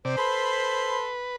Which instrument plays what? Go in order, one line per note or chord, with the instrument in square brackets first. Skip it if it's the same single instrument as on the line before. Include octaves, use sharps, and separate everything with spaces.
[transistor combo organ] C3 D5 [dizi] C5
[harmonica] A4 B5 C6 [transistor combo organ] B4